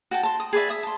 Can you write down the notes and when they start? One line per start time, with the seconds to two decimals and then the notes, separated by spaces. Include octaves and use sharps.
0.11 F#4 G5 A5
0.23 A5 C6
0.40 D#6
0.53 G#4 B4 D5 E5
0.69 E5 D#6
0.83 A5 C6